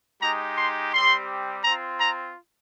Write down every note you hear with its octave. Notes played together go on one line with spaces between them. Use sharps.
G#3 D#4 G4 A#5
C6
G3 C4 G4 C6
C4 F4 A#5
A#5